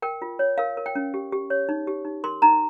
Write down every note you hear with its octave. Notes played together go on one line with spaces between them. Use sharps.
A#4 G5
F4
C#5
A#4 F5
A#4
G5
C#4
G4
G4
C#5
D#4
G4
D#4
A#4 C6
D#4 A#5